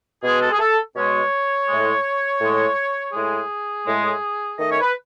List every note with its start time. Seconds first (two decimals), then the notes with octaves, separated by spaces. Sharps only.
0.23 B2 G#3 G#4
0.42 A4
0.52 G#4
0.59 A4
0.96 B2 G#3 C#5
1.68 A2 G#3
2.41 A2 G#3
3.13 A2 G#3 G#4
3.86 A2 G#3
4.58 D#3 A3 D#5
4.69 C#5
4.81 B4